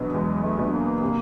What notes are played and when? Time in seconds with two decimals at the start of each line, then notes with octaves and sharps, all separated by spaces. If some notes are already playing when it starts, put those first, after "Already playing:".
Already playing: E2 B2 F#3 B3 D4
0.13 E2 G#3
0.43 A3
0.57 B2 F#3 B3 D4
0.72 A#3
1.01 C3